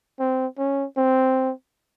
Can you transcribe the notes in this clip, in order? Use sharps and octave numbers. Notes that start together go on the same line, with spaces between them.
C4
C#4
C4